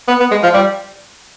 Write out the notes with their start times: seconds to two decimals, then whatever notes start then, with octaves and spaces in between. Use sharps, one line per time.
0.08 B3
0.20 B3
0.31 G#3
0.43 F3
0.54 G3